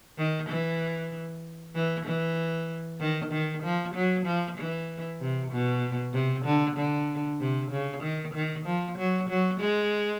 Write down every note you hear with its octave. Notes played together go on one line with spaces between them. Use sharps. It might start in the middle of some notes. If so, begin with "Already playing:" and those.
D#3
E3
E3
E3
D#3
D#3
F3
F#3
F3
E3
C3
B2
C3
D3
D3
C3
C#3
D#3
D#3
F3
F#3
F#3
G#3